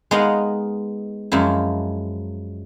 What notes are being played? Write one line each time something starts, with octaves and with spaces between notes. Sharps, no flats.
G#3 B3 D#4 A#4 F5 F#5
F#2 F3 G#3 E4